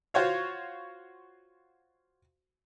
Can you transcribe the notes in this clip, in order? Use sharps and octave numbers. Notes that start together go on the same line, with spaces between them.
F4 F#4 C5 C#5 F5